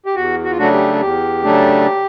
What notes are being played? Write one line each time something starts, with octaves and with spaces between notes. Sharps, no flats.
G4
E2 F#4
F#4
F4
C#3 F#3 A3 D4 F#4
G4
E2 G4
C#3 F#3 A3 D4